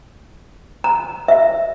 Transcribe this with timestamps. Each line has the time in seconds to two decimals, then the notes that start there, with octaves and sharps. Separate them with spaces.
0.84 A#5
1.28 E5